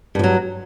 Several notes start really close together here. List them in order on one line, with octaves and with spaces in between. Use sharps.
G2 F3 F#3